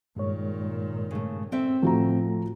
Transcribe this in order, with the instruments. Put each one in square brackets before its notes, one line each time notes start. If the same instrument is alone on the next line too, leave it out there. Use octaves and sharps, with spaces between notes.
[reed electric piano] G2 G#3 C#5 [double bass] A#2 D#3
[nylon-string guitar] C#3 A3
C4 A4 E5
[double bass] A2 [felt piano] F3 F#4 A#5 [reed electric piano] A3